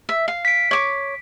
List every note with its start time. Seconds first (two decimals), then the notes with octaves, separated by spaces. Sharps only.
0.09 E5
0.28 F5
0.45 B6 D7
0.71 C#5 D6